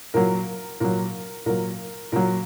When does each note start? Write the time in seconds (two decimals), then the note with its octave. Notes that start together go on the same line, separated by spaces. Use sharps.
0.14 A#2 F#3 A#4
0.80 A#2 F#3 A#4
1.46 A#2 F#3 A#4
2.12 A#2 F#3 A#4